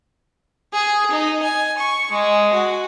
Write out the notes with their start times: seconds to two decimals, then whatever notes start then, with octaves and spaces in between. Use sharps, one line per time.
0.73 G#4
1.11 D#4
1.43 G#5
1.78 C#6
2.11 G#3
2.53 F#4